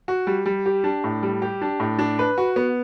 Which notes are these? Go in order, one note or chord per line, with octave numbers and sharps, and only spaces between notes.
F#4
G3
G3
G4
D4
A2
G3
G4
D4
A2
D4
B4
F#4
B3